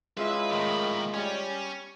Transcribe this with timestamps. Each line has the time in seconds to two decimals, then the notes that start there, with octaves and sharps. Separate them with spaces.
0.17 G#3 E4 F4 B4 E5
0.51 A2 D#3 A#4 D#5 B5
1.14 G3 C#4